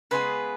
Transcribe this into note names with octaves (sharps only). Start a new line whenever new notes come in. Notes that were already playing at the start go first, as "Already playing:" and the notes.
C#3 G#3 B3 G#4 B4